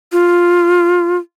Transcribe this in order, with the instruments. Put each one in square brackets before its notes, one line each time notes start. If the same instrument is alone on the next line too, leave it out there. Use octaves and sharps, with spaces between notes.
[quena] F4